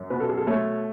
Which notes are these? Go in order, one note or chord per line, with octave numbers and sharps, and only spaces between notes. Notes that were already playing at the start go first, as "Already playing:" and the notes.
Already playing: F#2
B2 B4
A4
G#4
A4
A3 C#5